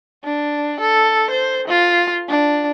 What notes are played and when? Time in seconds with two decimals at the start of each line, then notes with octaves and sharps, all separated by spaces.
0.24 D4
0.81 A4
1.30 C5
1.68 F4
2.29 D4